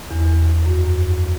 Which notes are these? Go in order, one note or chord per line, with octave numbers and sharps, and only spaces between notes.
E2
F#2